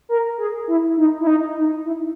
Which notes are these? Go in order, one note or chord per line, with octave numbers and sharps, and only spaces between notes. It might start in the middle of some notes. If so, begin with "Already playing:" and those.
A#4
G#4
E4
D#4
E4
D#4
D#4
E4